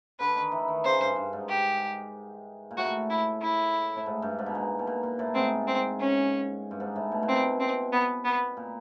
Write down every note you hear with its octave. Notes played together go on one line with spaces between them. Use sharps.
D3 B4
D#3
E3
D#3
C#3 C5
G2
G2
G#2
G4
A#2
A2 F#4
E4
E4
A2
G#2
G2
G#2
B2
A#2
B2
A#2
A#2
A2
G#2 C4
C4
C#4
G2
G#2
A2
B2
A#2
B2 C4
C4
B3
B3
A#2